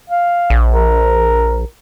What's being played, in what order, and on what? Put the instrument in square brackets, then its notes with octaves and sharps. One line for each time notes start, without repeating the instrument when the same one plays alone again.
[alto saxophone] F5
[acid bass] A#1
[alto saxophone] A#4